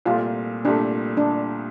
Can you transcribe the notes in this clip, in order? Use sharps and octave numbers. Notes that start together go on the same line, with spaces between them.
C2 A#2 A3 F4
C2 A#2 A3 D4
D4